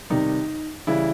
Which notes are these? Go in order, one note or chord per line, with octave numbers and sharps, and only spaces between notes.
C3 D#3 G3 D#4
C#3 E3 G3 E4